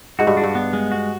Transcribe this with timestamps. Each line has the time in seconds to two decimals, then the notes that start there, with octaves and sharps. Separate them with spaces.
0.19 G#2 F#4
0.27 G2
0.37 D4
0.43 G2
0.55 B3
0.73 G#3
0.92 F#4